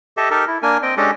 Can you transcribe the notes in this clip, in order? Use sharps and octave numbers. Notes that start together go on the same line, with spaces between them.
G4 A4 D#5 E5
D#4 G4 A4 A#4
E4
A#3 D4 A#4 G#5
C4 D#5 G5
G#3 C#4 D4 G4 A4 D#5